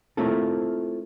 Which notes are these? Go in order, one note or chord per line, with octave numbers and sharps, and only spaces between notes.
A3 A#3 C4 E4 F4 A4